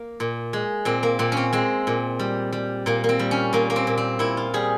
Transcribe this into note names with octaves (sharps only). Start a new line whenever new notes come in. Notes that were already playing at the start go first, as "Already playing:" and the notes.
Already playing: A#3
A#2
G#3
A#2 C4
A#3
A#2 C4
C4 C#4
G#3 C4
A#2
G3
G3
A#2 A#3
A#3
C4
G3
C#4
A#2 A#3
A#3
C4
A#2
C4
A#2 E4
F4
G3 G#4